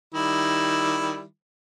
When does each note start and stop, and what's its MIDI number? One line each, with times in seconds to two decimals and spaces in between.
0.14 1.23 51
0.14 1.23 55
0.14 1.23 64